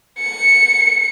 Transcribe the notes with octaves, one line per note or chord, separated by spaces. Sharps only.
C#7